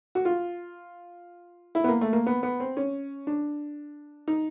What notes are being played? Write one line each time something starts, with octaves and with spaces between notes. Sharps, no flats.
F#4
F4
E4
B3
A#3
A3
A#3
B3
B3
C4
C#4
D4
D#4